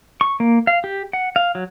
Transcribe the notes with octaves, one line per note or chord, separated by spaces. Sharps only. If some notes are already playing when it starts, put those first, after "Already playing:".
C#6
A#3
F5
G4
F#5
F5
F#3